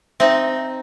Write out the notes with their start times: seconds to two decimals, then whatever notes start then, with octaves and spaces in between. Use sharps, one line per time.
0.20 C4 D#4 E5